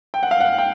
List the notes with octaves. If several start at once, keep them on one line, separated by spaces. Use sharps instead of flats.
G5
F#5
F5
F#5
G5